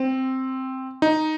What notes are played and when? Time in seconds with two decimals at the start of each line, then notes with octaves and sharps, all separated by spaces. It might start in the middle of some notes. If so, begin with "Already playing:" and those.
Already playing: C4
1.02 D#4